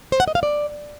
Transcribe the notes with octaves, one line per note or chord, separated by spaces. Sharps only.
C5
F#5
D#5
F5
D5